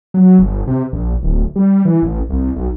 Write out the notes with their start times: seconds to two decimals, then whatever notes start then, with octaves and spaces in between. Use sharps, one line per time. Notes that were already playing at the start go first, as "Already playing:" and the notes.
0.14 F#3
0.39 G1
0.67 C3
0.92 A#1
1.23 D1
1.56 G3
1.85 E3
2.02 A1
2.29 C2
2.56 B1